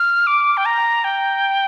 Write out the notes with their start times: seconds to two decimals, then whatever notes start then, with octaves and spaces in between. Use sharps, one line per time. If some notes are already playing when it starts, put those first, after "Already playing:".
Already playing: F6
0.27 D6
0.57 G5
0.66 A#5
1.04 G5